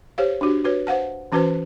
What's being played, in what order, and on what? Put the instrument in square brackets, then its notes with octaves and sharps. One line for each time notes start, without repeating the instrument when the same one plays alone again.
[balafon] G4 C5 C#5 F5
D4 F#4 G4
F#4 B4 C#5
C5 F5 F#5 A5
E3 C#4 F#4 B4 C5 A5